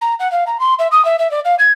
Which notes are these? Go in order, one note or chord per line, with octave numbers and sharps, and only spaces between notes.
A#5
F#5
F5
A#5
C6
E5
D#6
E5
E5
D5
F5
G#6